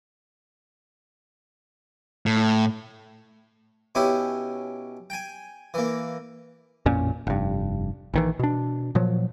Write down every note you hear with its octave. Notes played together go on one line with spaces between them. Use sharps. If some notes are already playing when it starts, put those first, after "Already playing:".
A2
B2 C#4 E4 G4
G5 G#5
E3 A#3
A1 F2 A#2 C#4
F1 G2
A#1 D#3 E3
B2 D4
A#2 F3 F#3